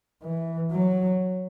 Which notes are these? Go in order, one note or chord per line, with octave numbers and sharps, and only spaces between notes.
E3
F#3